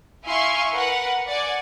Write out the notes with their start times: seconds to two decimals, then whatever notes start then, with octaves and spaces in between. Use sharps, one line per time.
0.24 E4 E5 F5 G#5 C6 C#6
0.71 A#4 B4 F#5
1.26 D5 F#5 G#5